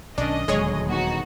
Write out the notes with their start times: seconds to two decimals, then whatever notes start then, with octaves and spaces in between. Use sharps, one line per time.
0.18 B1 D#3 C#4 D4 D#5
0.48 D#1 D2 F#3 G#3 G#4 C#5
0.88 B3 D#4 F#4